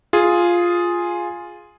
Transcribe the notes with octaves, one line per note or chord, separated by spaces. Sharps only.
F4 G#4